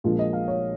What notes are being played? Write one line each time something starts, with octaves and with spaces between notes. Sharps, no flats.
A#1 A#2 F3 G#3 F4
D#5
F5
C#5